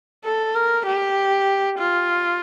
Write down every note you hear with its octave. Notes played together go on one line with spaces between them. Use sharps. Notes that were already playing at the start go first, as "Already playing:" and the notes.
A4
A#4
G4
F4